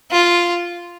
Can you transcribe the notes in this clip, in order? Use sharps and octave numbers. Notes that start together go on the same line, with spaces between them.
F4